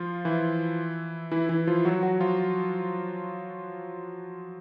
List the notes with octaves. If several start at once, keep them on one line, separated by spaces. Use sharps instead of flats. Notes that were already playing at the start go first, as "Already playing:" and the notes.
Already playing: F3 F4
E3 E4
E3 E4
E3 E4
F3 F4
F#3 F#4
F#3 F#4
F3 F4